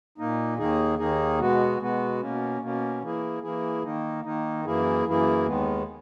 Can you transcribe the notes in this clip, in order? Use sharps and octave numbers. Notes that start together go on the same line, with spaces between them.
A#2 A#3 D#4
D#2 D#3 A#3 D#4 G#4
D#2 D#3 A#3 D#4 G#4
B2 G#3 B3 F#4
B2 G#3 B3 F#4
B2 A#3 C#4
B2 A#3 C#4
E3 A#3 E4 G#4
E3 A#3 E4 G#4
D#3 A#3 D#4
D#3 A#3 D#4
F#2 E3 A#3 E4 G#4
F#2 E3 A#3 E4 G#4
D#2 D#3 G#3 B3